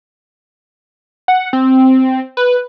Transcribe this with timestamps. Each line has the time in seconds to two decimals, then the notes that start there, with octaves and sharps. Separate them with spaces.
1.28 F#5
1.53 C4
2.37 B4